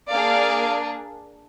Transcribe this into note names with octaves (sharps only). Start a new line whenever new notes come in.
A#3 D4 G#4 D5 F5